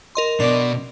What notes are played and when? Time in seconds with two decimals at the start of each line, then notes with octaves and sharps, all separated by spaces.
0.15 A#4 D#5 C6
0.40 B2 D4 D6